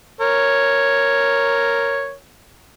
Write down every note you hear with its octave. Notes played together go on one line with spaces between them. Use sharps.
A#4 C#5